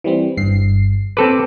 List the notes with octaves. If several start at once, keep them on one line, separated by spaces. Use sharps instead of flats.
E3 G3 C4
G1 G2 C7
C4 A4 B4 D6